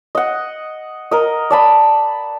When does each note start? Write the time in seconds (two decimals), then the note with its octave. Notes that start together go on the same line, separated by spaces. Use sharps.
0.15 D#5 F#5
1.11 A#4 D#5
1.50 D5 A5 B5